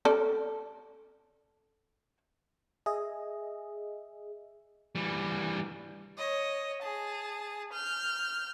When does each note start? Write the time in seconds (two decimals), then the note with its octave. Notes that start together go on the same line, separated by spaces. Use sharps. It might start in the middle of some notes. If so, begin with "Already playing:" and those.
0.05 C#4 A4 D5
2.86 G#4 D#5 E5
4.95 E3 G3
6.18 C#5 D#5
6.82 G#4 A5
7.72 F6 G6